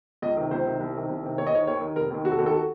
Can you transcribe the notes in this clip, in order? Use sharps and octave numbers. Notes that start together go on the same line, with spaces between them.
C#2 D#5
C3 D#3
C#2 C5
C3 D#3
C2
C3 D#3
C2
C3 D#3
D#2 C#5
D#5
D#3 C#5
D#2 C#5
D#3
F1 A#4
D#2 D#3
F1 F#4
A4
D#2 D#3 F#4
A4
F#4